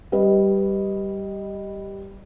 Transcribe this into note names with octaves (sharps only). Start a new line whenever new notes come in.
G3 B4 D#5